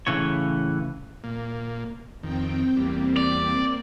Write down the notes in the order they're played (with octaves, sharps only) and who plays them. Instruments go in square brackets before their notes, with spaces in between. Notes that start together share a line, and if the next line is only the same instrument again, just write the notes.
[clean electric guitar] A2 C#3 E3 C#5
[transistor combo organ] A#2 A#3
[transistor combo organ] F2 D#3 [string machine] C4 G5
[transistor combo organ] E2 G3 [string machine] A#3 C4
[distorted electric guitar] D5